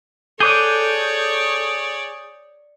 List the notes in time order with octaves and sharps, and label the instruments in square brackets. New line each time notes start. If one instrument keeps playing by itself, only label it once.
[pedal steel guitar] G#4 D6 F#6 [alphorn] A4 [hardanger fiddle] C#5 D5 [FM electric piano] D#6 G6